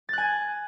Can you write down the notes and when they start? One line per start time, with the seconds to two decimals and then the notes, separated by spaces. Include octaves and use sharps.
0.09 A6
0.13 F#6
0.18 G#5